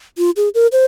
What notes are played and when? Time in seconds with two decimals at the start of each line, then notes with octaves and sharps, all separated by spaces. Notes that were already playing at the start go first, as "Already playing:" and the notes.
0.18 F4
0.36 G#4
0.54 A#4
0.72 C5